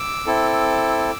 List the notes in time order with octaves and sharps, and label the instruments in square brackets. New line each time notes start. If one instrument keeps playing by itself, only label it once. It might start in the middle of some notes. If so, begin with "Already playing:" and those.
Already playing: [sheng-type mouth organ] D6 E6
C4 E4 A4